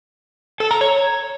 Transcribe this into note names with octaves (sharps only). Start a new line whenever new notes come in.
A4
A#5
C#5